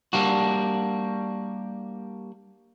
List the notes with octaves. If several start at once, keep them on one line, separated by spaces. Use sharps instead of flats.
G3 A#3 D4 F#4